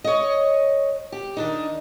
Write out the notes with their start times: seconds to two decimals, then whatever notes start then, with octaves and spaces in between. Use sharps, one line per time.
0.04 C#5 D#5
1.12 G4
1.37 D#3 D4 D#4